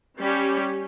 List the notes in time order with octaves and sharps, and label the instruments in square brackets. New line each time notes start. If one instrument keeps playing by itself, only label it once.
[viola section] G3 C#4 G4